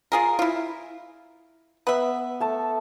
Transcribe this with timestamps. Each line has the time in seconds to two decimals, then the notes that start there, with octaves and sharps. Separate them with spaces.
0.12 F4 G#4 A#4
0.39 E4 F4
1.87 B3 B4 E5
2.40 A3 A5